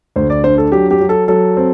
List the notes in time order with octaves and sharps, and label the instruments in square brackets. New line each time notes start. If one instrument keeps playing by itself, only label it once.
[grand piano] D2 C5
D5
D4 C5
A4
F#3 G4
G4
F#3
A4
F#3 A4
C4